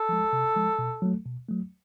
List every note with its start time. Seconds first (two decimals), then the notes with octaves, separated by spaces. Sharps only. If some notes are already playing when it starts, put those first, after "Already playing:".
Already playing: A4
0.09 F3 G#3
0.33 C3
0.56 F3 G#3
0.79 B2
1.02 F#3 A3
1.25 B2
1.49 F#3 A3